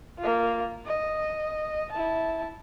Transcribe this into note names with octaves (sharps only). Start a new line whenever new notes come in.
A#3 F4
D#5
E4 A5